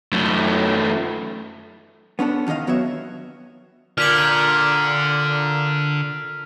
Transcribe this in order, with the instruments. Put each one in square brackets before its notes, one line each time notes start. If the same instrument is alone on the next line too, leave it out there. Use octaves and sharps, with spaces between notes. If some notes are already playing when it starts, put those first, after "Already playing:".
[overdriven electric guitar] F#2 A3
[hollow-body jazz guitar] B3 C#4 D4 A4
E2 D#3 G4 D#5 F5
F#3 B3 F#4 C#5 E5
[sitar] A#2 [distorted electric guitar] D3 [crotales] F6 B6 F#7